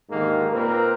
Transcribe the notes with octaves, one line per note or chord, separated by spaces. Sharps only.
D#2 G#2 D3 D#3 A#3
A#2 A#3 C4 A#4 B4